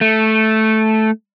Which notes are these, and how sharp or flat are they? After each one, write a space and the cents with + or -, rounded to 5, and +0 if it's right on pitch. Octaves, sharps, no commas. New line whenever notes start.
A3 -5